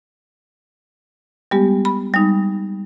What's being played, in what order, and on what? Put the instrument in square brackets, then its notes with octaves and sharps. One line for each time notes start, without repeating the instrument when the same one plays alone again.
[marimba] G3 G#3 B3 G4
B5
G3 G#3 D#4